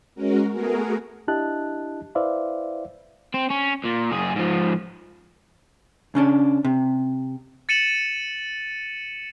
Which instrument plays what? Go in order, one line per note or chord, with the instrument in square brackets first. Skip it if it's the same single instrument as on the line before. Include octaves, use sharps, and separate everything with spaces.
[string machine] G#3 C#4 F#4 A#4
A3 B3 F#4 G#4 A#4
[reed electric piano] D4 E4 G4 D#5 A5 F#6
E4 B4 C5 D5 E5 F5
[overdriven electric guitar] C4
C#4
A#2
F#2 G#4
G#2 F3
[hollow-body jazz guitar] C#3 C#4 D4
C3
[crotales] A6 C#7 D#7 E7 F#7